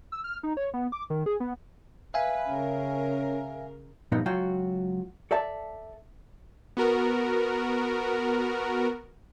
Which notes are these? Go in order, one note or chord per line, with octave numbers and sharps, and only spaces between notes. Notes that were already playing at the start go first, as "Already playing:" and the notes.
E6
F6
D#4
C#5
B3
D6
D#3
G#4
B3
B4 E5 F5 G#5
C#3 C#4 A#4
G2 A#2 F3 B3 D#4
C#2 F#3 F4 F#4 G5
A4 D5 E5 A5
B3 F#4 A#4